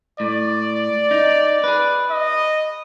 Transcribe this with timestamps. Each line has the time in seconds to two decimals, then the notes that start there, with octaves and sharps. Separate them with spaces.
0.20 A2 D5
1.11 D#4
1.64 G#4 B4
2.11 D#5